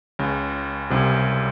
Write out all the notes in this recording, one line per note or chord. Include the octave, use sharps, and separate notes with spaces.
C#2 C#3
C2 C3